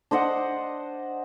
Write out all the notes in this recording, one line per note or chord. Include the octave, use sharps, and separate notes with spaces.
D4 C5 D#5 F#5